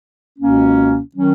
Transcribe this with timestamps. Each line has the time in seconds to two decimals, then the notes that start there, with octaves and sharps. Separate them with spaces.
0.38 C#2 B2 A#3 C#4
1.15 D#3 F#3 C#4